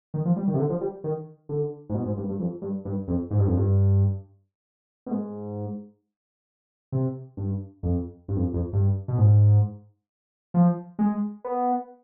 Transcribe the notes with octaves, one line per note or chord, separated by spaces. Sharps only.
D#3
F3
G3
D#3
C3
D3
F3
G3
D#3
D3
G#2
B2
G#2
G2
G2
F2
G2
G2
F2
G#2
G2
F2
G2
B2
G#2
C3
G2
F2
G2
F2
F2
G2
B2
G#2
F3
G#3
B3